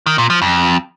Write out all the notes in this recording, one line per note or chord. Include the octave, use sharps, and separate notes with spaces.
D#3
A#2
F3
F2